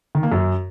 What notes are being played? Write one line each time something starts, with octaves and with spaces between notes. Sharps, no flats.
D#3
A#3
F#2